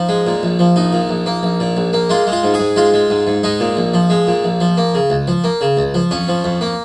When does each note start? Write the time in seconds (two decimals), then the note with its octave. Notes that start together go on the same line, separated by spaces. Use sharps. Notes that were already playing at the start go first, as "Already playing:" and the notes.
Already playing: F3 D#4
0.09 G#3
0.27 A#2
0.43 A#1
0.59 F3
0.76 A#1 D#4
0.93 A#2
1.09 A#1
1.26 A#3
1.43 A#1
1.60 A#2
1.77 A#1
1.93 A#3
2.10 G#3 F4
2.27 G#3
2.32 F4
2.44 G#2
2.54 G#4
2.60 G#2
2.76 G#3 F4
2.94 G#3
3.10 G#2
3.27 G#2
3.44 G#3 D#4
3.60 A#2
3.77 A#1
3.94 F3
4.10 G#3
4.27 A#2
4.44 A#1
4.61 F3
4.77 A#3
4.94 C#3
5.10 C#2
5.28 F3
5.44 A#3
5.61 C#3
5.77 C#2
5.94 F3
6.11 F2 C#4
6.28 F3
6.44 F2
6.61 A#3